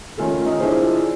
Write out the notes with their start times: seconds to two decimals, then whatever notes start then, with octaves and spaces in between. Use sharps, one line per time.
0.17 D#3 A3 C#4 F4 A4
0.46 D#4 D#5
0.60 D4 E4 F4 G#4 C5